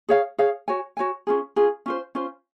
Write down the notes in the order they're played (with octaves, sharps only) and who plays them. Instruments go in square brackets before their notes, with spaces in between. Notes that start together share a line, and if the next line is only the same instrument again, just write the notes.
[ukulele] G#4 C#5 F5
G#4 C#5 F5
F#4 C#5 G#5
F#4 C#5 G#5
C#4 F4 G#4
C#4 F4 G#4
C#4 F4 C5
C#4 F4 C5